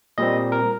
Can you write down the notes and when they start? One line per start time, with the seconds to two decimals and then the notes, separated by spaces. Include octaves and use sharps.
0.18 A#2 G3 C4 D#5
0.52 A#4